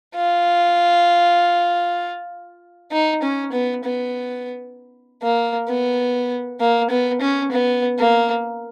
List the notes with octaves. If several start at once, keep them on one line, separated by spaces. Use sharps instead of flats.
F4
D#4
C#4
B3
B3
A#3
B3
A#3
B3
C#4
B3
A#3